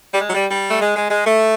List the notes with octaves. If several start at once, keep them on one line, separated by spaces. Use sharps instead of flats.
G3
G#3
F#3
G3
G3
A3
G#3
G#3
G#3
A3